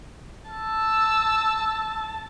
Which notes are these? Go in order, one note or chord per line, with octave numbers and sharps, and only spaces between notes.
A5 E6